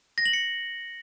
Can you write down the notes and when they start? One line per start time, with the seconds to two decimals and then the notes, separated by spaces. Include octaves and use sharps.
0.18 A#6
0.26 F#7
0.33 C#7